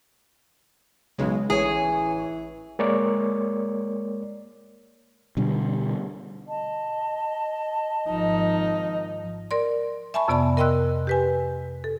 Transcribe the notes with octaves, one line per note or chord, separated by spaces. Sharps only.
B1 C#3 G#3
A1 E3 G#4 C#5
G#3 A#3 A#4 C#5 D5
B2 D3 G3
D#5 A5
G#1 F3 D#4
A#4 D5 C6
E5 G#5 A5 B5 C#6
F2 C3 B3 D5 A5 B5
A#4 D#5 G5 C6 E6 F#6
G4 B4 G#5
A4